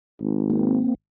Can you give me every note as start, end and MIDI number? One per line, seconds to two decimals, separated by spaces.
0.21 0.81 32
0.50 0.95 58
0.50 0.95 60